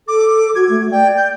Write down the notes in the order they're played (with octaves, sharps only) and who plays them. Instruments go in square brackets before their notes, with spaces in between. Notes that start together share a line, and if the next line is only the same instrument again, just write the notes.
[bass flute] A4 [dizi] D6
[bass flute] F#4 [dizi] G#6
[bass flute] A3
[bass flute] D5 [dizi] G5
[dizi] G6